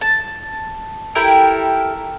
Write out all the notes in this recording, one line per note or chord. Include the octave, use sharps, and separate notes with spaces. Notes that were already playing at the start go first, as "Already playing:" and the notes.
A5
E4 G4 A4 A#4